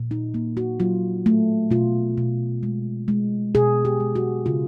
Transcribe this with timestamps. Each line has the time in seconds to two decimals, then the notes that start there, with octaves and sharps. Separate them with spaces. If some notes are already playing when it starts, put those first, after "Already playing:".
Already playing: A#2
0.11 D#4
0.34 A#3
0.57 F#4
0.80 F#3 F4
1.26 A3
1.71 B2 F4
2.18 B2
2.63 G#3
3.08 G#3
3.55 B2 G#4
3.85 G4
4.00 G#3
4.15 F#4
4.46 C#3 F4